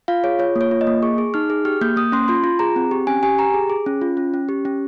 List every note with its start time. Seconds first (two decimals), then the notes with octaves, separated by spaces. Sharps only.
0.08 F4 F5
0.24 G#4 C#5
0.39 F4 C#5
0.56 A#3
0.61 C#5
0.71 F4
0.81 D#5
0.87 A#3
1.02 G#4 C#6
1.18 G#4
1.34 D#4 F6
1.50 G#4
1.65 G4 F6
1.81 A#3 G6
1.96 A#3 D#6
2.12 C#4 C6
2.28 F4 C6
2.44 F4
2.59 G#4 A#5
2.76 C4
2.91 G4
3.07 C#4 G#5
3.23 G4 G#5
3.38 G4 A#5
3.54 G#4
3.70 G#4
3.86 C#4
4.01 F4
4.17 C#4
4.34 C#4
4.49 G4
4.65 C#4